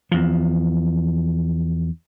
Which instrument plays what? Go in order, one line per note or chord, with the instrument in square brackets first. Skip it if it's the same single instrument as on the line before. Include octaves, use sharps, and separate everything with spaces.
[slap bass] E2 F3